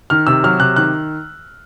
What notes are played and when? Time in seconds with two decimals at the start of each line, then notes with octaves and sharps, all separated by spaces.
0.10 D#3 F6
0.27 C3 E6
0.44 F#3 F6
0.60 C3 F#6
0.76 D#3 F#6